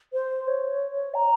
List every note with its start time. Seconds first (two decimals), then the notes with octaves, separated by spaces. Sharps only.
0.13 C5
0.47 C#5
1.14 A#5